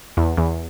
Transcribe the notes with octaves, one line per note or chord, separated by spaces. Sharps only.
E2
E2